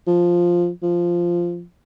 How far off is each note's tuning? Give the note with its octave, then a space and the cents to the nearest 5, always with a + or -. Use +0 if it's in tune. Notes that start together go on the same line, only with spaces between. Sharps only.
F3 +0
F3 -5